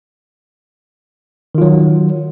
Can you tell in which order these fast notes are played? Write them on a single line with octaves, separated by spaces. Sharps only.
D#3 F4 F#3